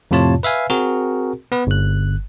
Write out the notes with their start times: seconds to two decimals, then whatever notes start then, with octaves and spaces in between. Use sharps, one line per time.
0.11 F2 A2 C3 F4 C#5 A5
0.43 B4 E5 F5 G#5
0.70 C4 F#4 G#4 A#4
1.52 B3 B4
1.67 G1 F#6